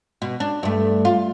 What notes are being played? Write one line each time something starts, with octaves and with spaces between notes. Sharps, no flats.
B2
D4
G2 A3
F4